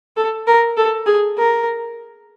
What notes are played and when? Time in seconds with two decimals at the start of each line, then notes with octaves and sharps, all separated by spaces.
0.17 A4
0.47 A#4
0.77 A4
1.06 G#4
1.38 A#4